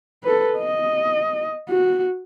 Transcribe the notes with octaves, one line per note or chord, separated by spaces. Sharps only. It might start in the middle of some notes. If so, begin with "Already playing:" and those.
A4 B4
D#5
F#4